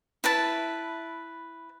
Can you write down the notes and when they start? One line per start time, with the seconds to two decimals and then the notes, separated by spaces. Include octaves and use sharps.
0.24 E4 B4 A5